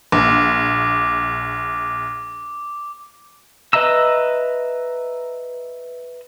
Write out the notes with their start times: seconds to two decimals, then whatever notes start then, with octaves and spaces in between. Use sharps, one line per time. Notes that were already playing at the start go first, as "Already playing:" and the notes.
0.12 A#1 D6
3.73 B4 D#5 E5 A#5 E6